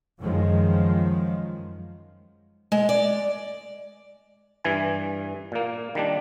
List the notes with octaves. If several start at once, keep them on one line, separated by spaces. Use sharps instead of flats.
F#2 D#3 F3 G#3
G#3
D5
G2 E3 G#5
A#2 A#3
D#3 G3 D4